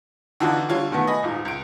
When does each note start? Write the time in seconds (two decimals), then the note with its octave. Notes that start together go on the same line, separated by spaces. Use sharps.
0.40 D3 E3 D4 D#4 F4 F#4
0.69 D3 G3 F4 C#5
0.91 B2 D#3 A3 B3
1.07 D#5 G#5 B5
1.23 D#1 G#2 F4
1.45 C#2 D7